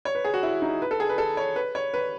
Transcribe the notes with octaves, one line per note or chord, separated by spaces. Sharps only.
C#5
B4
G#4
F#4
E4
D#4
B4
A4
G#4
B4
A4
C#5
B4
C#5
B4